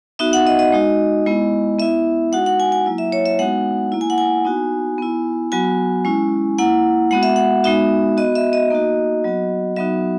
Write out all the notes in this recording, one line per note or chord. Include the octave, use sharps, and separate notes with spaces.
B3 D#4 F#4 E5
F#5
D#5
D#5
G#3 D#4 F#4
G#3 B3 E4
B3 E4 E5
G#3 D#4 F#4 F#5
F#5
G#5
G#5
F#3 A#3 E4
E5
C#5
E5
G#3 B3 D#4 F#4 F#5
A#3 E4
G#5
F#5
G#5
B3 D#4 F#4
B3 E4
F#3 B3 F#4 G#5
G#3 C#4 E4
A#3 E4 F#5
G#3 B3 F#4 F#5
E5
F#5
G#3 B3 D#4 F#4 E5
B3 F#4 D#5
E5
D#5
A#3 D#4 F#4
F#3 B3 F#4
F#3 B3 D#4 F#4 E5